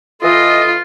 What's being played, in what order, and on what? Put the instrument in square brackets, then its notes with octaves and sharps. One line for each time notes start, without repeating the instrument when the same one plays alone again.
[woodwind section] E3 A4 D#5 [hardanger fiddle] F4